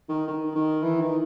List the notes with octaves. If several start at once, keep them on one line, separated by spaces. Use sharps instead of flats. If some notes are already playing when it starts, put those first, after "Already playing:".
D#3
D#3
D#3
E3
D#3